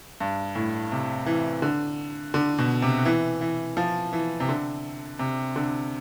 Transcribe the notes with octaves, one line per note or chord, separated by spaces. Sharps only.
G2
A2
C3
E3
D3
D3
B2
C3
E3
E3
F3
E3
C3
D3
C3
D3